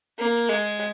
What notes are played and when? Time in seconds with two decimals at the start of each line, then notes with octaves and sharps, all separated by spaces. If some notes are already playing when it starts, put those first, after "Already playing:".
0.18 A#3
0.49 G#3